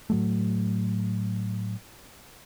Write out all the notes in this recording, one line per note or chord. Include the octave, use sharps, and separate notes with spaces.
A2 F#3 A3